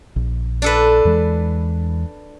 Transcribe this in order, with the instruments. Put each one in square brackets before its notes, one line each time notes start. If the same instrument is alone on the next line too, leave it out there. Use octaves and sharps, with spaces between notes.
[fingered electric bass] A#1
[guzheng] D4 A4 B4
[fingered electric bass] E2 E3 G#3